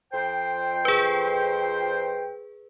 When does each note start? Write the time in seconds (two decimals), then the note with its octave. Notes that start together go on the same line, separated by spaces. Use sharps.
0.13 F2 C5 G5
0.85 G#4 B4